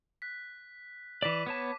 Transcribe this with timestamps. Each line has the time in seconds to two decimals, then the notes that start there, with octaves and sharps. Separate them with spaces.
0.22 F#6 B6
1.22 E3 D5 D6 B6 D#7
1.46 B3 C#5 A5